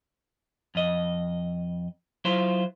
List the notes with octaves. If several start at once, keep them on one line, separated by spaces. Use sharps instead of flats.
F2 D#5
F#3 E4 F4 C5